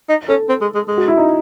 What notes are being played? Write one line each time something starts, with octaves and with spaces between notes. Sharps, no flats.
D#4
C#4 A4
C4
G#3
G#3
G#3
F#4
E4
D#4